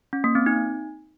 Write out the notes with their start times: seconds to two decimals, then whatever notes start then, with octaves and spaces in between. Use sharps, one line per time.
0.13 C#4
0.24 A#3
0.35 C4
0.46 D#4